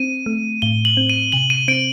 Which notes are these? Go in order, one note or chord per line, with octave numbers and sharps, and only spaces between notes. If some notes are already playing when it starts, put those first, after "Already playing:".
Already playing: C4 D#7
A3
A2 G7
F#7
C4
D#7
C3 F#7
D#7
C4 D7